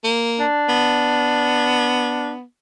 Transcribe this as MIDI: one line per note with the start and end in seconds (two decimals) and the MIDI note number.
0.04 0.45 58
0.40 2.32 62
0.69 2.43 59